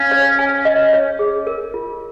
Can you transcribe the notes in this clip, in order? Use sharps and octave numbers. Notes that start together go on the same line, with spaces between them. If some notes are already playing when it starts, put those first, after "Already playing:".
Already playing: C#4 F5
C#5
G#5
D#5
C#5
G#4
A#4
F4